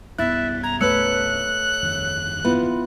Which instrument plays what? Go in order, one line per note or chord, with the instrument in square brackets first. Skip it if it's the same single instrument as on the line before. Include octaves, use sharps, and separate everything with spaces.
[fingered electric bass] C2 G2 B3 [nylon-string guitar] E4 [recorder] E5 [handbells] F#6 A6
[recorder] A#5 [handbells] G#6
[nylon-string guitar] A3 B4 [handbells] C#5 E6 C#7 [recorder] F#6
[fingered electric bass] G1 F2 D#3
[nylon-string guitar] B3 [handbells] E4 F4